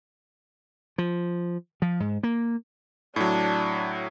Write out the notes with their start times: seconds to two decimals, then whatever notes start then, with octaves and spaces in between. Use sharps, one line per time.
0.98 F3
1.82 F3
2.00 G#2
2.23 A#3
3.16 A2 F#3 D4